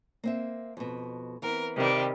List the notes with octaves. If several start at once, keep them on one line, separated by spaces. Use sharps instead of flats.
A#3 C4 E5
F2 B2
E3 B3 C4 A#4
C3 D#3 G3